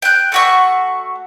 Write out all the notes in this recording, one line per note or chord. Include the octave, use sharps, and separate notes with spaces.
G5 F#6
A3 F#4 C#6